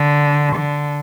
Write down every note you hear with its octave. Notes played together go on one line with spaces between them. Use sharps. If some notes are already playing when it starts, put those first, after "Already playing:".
Already playing: D3
D3